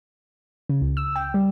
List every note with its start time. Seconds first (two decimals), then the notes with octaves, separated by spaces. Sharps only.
0.69 C#3
0.81 C#2
0.97 E6
1.16 G5
1.34 G3